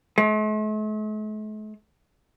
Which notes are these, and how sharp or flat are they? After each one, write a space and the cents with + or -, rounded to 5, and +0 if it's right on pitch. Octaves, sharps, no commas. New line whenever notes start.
A3 -45